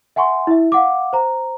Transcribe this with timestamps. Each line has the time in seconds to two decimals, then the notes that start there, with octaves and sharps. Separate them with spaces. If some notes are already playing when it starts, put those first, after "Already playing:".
0.16 E5 F#5 G#5 C6 C#6
0.47 E4 E5
0.72 F5 F#5 D6
1.13 C5 A#5